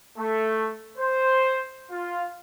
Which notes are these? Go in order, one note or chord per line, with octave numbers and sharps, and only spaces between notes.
A3
C5
F4